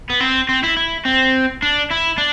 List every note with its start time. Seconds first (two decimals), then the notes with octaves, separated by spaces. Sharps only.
0.10 B3
0.21 C4
0.49 C4
0.64 E4
0.77 E4
1.05 C4
1.62 D4
1.90 E4
2.18 D4